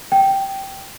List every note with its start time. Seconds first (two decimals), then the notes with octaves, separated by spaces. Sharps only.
0.12 G5